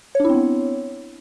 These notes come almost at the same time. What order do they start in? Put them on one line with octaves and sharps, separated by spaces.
C#5 D4 E4 C4 B3